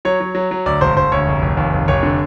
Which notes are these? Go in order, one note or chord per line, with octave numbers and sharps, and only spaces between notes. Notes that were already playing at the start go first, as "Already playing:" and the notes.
F#3 C#5
F#3
F#3
F#3
D2 D5
E1 C5
E1 C5
D2 C#5
F1
F1
D#2
F1
F1 C#5
D3